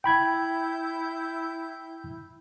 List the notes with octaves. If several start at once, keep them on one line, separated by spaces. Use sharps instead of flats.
E4 G5 B5 G6 G#6